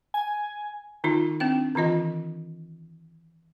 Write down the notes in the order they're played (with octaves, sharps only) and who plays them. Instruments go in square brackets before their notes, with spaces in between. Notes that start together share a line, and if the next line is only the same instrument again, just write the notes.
[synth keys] G#5
[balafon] D#3 D#4 F4
C4 D4 G5
D#3 E3 F4 D#5